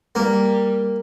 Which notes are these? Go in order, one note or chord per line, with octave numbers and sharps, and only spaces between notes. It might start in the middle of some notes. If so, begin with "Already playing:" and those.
G3 A#3